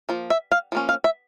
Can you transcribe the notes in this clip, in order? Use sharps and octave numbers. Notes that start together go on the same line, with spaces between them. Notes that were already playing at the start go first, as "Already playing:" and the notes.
F3 A#3
E5
F5
F3 A#3 C#4
F5
E5